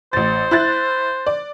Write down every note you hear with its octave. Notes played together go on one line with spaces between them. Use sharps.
A1 C5 A6
E4 F#6 A6
D5